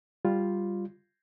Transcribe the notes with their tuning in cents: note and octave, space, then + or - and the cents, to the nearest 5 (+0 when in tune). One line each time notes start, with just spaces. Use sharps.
G3 +5 F4 +0